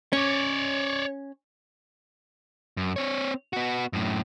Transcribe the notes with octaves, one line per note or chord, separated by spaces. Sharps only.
C#4 C#5 D5
F#2
C4 C#5
B3 F#4
F#2 A2